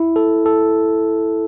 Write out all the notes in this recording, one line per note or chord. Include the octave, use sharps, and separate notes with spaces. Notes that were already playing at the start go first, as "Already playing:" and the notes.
Already playing: E4
A4
A4